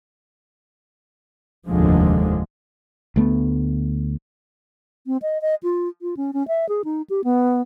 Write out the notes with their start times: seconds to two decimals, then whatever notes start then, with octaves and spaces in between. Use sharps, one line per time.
1.67 F1 D#2 A2 D3 F3 G#3
3.16 D2 A3 B3
5.07 C4
5.22 D#5
5.42 D#5
5.63 F4
6.02 F4
6.17 C#4
6.33 C#4
6.48 E5
6.69 G#4
6.84 D#4
7.10 G4
7.24 B3